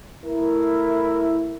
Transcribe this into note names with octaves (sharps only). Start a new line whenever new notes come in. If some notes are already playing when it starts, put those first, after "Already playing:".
A3 E4 A#4